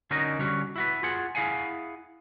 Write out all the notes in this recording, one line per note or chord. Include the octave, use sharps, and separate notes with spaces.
D3 C#4 D#4 F#4 A#4 D#5
D3 G3 C#4 F#4
E4 F#4 B4
F4 G#4 F#5
E4 G#4 F5 F#5 G#5